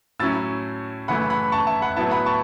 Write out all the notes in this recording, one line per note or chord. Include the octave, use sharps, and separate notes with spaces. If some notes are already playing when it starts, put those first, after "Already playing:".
A2 F#3 C#4 E4 E6 A6
F#2 C#3 E3 A3 E4 F#5 B5
F#5 B5
A5 C#6
E5 A5
F#5 B5
A2 F#3 B3 E4 E5 A5
F#5 B5
A5 C#6